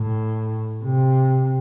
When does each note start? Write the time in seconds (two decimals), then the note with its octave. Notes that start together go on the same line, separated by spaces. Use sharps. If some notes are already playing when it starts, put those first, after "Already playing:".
Already playing: A2
0.84 C3